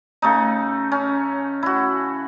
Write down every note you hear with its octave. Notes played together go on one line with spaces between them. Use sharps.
C#3 A3 D#4
C#4
E4 F#4